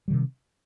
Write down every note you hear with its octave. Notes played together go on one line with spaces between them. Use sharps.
C3 D#3 G3